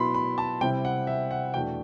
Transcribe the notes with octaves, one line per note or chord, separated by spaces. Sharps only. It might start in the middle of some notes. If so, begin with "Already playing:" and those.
Already playing: B2 F#3 B3 E4 B5 C6
B5
A5
C3 G3 C4 E4 G5
F#5
E5
F#5
E2 B2 A3 D4 G5